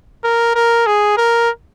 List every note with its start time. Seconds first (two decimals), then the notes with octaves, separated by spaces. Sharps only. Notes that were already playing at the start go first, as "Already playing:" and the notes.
0.24 A#4
0.55 A#4
0.87 G#4
1.17 A#4